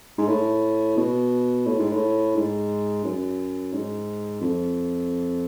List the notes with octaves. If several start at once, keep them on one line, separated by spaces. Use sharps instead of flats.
G#2
A2
B2
A2
G#2
A2
G#2
F#2
G#2
F2